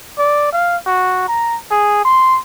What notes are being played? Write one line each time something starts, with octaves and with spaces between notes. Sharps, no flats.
D5
F5
F#4
A#5
G#4
C6